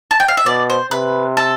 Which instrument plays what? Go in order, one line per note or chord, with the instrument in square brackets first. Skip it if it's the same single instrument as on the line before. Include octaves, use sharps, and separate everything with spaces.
[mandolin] A5
G5
F5
E5
[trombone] B2 [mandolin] D5
[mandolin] C5
[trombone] C3 [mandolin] B4
[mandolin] A4